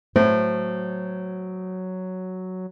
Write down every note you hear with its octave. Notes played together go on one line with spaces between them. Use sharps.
A2 F#3 C5